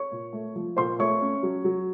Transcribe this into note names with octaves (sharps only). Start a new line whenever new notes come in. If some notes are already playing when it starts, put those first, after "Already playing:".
Already playing: C#5 C#6
A#2
A3
F3
A#2 C5 C6
A3 C#5 C#6
C#4
F#3
F#3